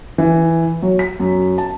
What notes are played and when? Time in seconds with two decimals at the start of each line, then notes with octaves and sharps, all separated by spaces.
0.18 E3
0.82 F#3
0.99 B6
1.20 F#2
1.58 A5